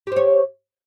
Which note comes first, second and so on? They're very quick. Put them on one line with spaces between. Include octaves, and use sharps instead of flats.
G4 C5 C#5